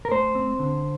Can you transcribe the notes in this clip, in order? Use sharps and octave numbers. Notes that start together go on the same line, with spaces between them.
A#4
A3 C5
C4
D3